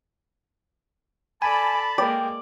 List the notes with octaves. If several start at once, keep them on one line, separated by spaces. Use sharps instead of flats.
A4 D5 G#5 A5 B5
G#3 A#3 D5 G5